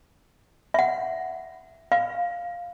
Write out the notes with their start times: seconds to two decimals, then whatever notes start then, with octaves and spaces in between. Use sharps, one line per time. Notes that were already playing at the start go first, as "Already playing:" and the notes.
0.74 E5 F#5
1.92 F5